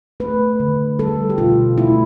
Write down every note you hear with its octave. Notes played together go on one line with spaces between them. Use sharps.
A3 B4
D3
G3 A4
G4
B2 F4
A3 E4